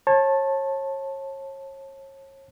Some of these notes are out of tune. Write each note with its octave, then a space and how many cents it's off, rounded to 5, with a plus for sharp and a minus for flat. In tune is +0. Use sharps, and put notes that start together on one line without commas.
C#5 -35 A5 +0